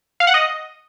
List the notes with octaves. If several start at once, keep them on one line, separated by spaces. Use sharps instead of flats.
F5
F#5
D#5